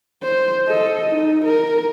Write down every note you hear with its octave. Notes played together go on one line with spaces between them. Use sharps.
C5
A4 D#5
D#4
A#4